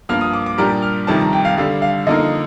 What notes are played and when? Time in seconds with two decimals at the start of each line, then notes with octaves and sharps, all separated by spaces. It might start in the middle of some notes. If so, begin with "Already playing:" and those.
0.09 G2 F3 A#3 F6
0.21 D#6
0.33 D6
0.46 D6
0.58 A#2 G3 D4 G4 A#4 A#5
0.83 F6
1.07 F2 C3 D#3 G3 A5
1.21 A#5
1.33 G5
1.45 F5
1.57 D3 G3 D4 A4 F5
1.82 F5
2.07 D3 F3 A#3 D#4 A#4 D#5